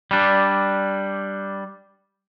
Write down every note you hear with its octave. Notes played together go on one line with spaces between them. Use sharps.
G3 D4